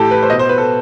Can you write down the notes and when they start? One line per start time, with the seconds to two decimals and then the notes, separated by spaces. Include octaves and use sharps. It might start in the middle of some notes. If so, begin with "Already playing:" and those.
Already playing: A2 E3 G4 A4
0.11 B4
0.23 C5
0.30 B2 D#5
0.39 C5
0.49 B4
0.58 A4